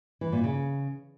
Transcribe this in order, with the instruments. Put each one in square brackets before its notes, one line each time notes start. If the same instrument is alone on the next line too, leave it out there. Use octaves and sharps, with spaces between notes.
[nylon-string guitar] E3
A#2
C#3